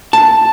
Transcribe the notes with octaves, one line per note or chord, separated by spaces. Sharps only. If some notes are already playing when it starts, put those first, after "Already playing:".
A5